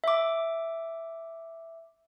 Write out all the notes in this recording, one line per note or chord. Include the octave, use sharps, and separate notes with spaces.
E5 D6